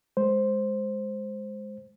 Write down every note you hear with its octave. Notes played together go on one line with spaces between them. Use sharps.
G#3 C5